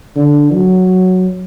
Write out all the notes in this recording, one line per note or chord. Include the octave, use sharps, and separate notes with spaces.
D3
F#3